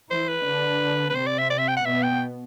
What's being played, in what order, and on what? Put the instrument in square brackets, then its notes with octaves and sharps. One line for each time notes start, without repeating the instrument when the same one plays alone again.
[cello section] E3 E4 [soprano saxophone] C5
[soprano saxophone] B4
[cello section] D3 D4
[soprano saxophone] B4
[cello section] C3 C4 [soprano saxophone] C5
[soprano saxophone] D5
E5
D5
E5
G5
F#5
[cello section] B2 B3 [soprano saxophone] E5
[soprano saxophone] G5